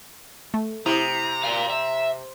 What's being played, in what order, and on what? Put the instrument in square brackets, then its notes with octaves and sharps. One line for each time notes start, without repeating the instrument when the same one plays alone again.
[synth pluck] A3
[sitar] C3 [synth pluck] E4 D#6 [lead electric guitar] A#5
[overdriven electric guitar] D5 F5
E5